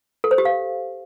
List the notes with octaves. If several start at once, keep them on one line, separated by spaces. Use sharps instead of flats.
A4
C5
G4
F5